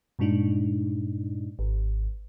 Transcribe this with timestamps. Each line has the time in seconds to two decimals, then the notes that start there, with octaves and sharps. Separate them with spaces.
0.19 G2 A#2 G#3 D4 D#4
1.59 G#1